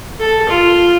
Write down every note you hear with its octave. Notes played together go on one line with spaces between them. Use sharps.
A4
F4